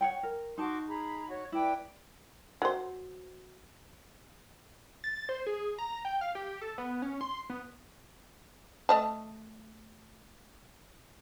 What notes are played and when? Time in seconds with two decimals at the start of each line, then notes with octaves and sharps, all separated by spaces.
0.01 C#5 F#5 G5
0.23 A#4
0.58 D#4 F#4 A5 C6 D6
0.88 G#4 A#5 B5
1.27 F#4 C#5
1.52 E4 B4 D5 G5 D6
2.62 F#3 C5
5.04 A6
5.29 C5
5.47 G#4
5.78 A#5
6.05 G5
6.21 F5
6.35 G4
6.61 A4
6.78 B3
7.02 C#4
7.21 C6
7.50 B3
8.89 A3 D#5 A5